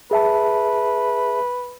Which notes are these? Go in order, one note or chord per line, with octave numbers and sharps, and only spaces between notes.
G#4 B4 E5 A5